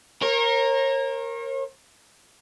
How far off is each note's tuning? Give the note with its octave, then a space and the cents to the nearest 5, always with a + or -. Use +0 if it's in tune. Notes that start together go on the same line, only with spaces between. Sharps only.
A#4 +0 C#5 -40